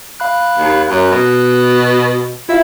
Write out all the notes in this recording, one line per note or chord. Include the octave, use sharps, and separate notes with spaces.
F5 B5 F#6
D#2
F#2 F#6
B2
E4 F4 E5 F5